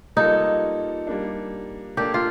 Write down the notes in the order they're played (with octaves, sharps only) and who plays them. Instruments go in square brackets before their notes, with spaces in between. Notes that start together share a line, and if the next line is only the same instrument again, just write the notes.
[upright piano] G3 A#3 F4 A4 [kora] D#4
[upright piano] G3 A#3 D4
[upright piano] A#3 D4 A4 D5 [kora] G4
[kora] F4